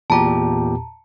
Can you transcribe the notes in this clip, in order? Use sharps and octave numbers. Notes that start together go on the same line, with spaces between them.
E2 A#2 G4 A5 A#5